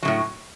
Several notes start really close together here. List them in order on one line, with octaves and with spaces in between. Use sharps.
F#3 C#3 A2